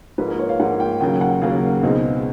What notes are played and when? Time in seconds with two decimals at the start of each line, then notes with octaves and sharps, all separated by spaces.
0.18 G#2 F3 A#3 B4
0.28 A#4
0.39 C#5
0.49 F5
0.59 G#2 F3 A#3 F#5
0.80 G5
1.00 D#2 C#3 F#3 A#3 G5
1.21 F#5
1.42 D#2 C#3 F#3 A#3 F5
1.83 C#2 B2 G#3 C4 D#4